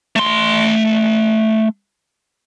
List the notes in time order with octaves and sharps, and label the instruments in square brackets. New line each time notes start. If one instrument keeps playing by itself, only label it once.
[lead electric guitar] A3 C6